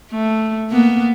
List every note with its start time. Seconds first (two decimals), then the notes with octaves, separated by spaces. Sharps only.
0.12 A3
0.71 A#3 B3